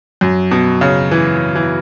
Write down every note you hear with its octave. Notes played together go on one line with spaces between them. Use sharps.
F#2
B2
C#3
E3
E3